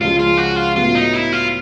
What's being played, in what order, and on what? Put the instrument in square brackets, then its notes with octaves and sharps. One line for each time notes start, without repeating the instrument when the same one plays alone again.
[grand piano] C#2 C#3 F3 G#3 [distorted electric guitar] F4
[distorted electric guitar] F4
F#4
F4
[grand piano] A2 F#3 B3 [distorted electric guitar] F4
[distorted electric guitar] D#4
E4
F4